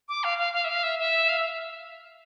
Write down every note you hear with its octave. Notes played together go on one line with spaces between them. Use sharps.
D6
F5
F5
F5
E5
F5
E5
E5
F5
E5